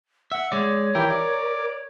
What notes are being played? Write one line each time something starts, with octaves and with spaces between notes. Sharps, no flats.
E5 F#5
G#3 C#5 D5
E3 G4 A#4
D5